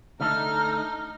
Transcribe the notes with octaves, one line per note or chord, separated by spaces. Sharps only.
D3 A3 D#4 A4 F6